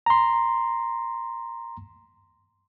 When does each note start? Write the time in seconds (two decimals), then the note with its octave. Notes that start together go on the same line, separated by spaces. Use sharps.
0.06 A#5 C6